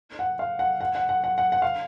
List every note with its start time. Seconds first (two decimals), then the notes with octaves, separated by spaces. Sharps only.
0.19 F#5
0.39 F5
0.59 F#5
0.81 F#5
0.95 F#5
1.09 F#5
1.24 F#5
1.38 F#5
1.52 F#5
1.62 F5